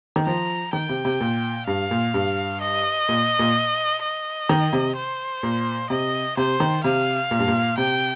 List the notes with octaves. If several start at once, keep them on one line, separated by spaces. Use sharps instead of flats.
D#3
F3 A#5
D#3 G5
C3
C3
A#2
G2 F5
A#2
G2
D#5
A#2
A#2
D#5
D#3
C3
C5
A#2
C3 D#5
C3 C5
D#3
C3 F5
A#2
G2
A#2
C3 G5